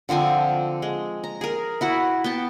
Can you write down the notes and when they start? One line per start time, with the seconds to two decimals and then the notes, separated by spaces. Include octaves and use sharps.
0.09 D3 F3 C4 G#5
0.82 G#3
1.24 A#5
1.41 G#4 A#4
1.81 E4 F#4 F#5
2.24 B3 G5 A5